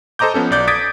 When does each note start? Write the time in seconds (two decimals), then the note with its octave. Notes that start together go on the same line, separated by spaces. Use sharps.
0.19 A4 C5 D#5 A#5 D6 G6
0.34 F3 B3 C#4 A4
0.51 B1 D5 G6
0.68 D6 D#6 G#6 A6 B6 D7